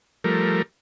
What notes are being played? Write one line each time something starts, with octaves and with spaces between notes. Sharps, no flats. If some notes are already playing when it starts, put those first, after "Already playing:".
F3 G3 A3 A#4